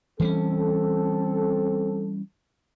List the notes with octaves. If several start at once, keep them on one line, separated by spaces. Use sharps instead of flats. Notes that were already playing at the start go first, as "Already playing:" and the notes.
E3 G3 C4 C#4 A4